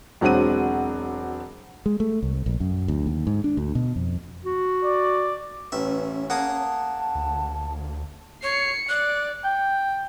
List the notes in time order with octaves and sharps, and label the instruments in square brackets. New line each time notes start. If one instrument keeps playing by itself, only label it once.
[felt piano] E1 F#3 C4 D4 F#5 D#7
[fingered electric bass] G#3
A3
C2
A#1
F#2
D2
D#2
G#2
D4
D2
B2
F2
[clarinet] F#4
[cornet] D5
[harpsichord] A1 E5 [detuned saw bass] C#4 [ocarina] B4
[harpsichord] A#3 G#4 D#6 [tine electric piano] F#5 [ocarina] A5
[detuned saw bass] D2
[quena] C#5 [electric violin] C7 C#7
[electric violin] D5 [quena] F#6
[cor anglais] G5